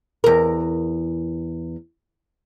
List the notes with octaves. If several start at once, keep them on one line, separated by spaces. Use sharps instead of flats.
E2 A#4